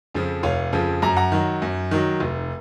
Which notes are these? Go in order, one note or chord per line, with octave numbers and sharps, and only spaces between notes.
F2 C#3 F3
F1 C#5 F5
F2 C#3 F3
F#2 A#5
F#5 A#5
D#3 F#3
F#2
D#3 F#3
F1